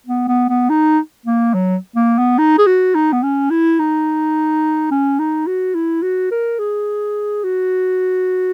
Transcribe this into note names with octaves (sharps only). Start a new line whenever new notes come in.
B3
B3
B3
D#4
A#3
F#3
A#3
B3
D#4
G#4
F#4
D#4
B3
C#4
E4
D#4
C#4
D#4
F#4
E4
F#4
A#4
G#4
F#4